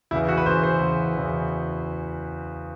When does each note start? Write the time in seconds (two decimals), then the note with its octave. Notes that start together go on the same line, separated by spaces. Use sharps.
0.11 E2 C#3 E3 E4
0.28 F#4
0.37 B4
0.46 E2 C#3 E3 C5
0.64 C5
0.81 E2 C#3 E3
1.16 E2 C#3 E3